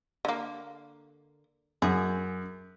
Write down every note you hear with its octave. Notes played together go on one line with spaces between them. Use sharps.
D3 A#3
F#2 G#4